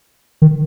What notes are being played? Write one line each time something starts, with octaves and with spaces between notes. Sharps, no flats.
D#3